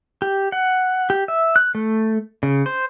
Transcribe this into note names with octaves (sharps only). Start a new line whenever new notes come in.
G4
F#5
G4
E5
F#6
A3
C#3
C5